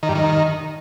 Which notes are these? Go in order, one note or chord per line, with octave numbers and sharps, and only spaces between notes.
D#3
G2
D#3